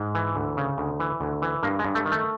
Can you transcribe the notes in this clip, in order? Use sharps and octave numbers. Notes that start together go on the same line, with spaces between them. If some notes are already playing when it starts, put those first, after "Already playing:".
Already playing: G#2 G#3
E3
D2
C#3
D2
E3
D2
E3
G2 A#3
G#3
G2
A3
D#3
A3